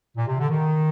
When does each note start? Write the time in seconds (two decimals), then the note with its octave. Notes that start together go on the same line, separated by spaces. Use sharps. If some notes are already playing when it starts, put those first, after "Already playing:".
0.17 A#2
0.28 C3
0.39 D3
0.49 D#3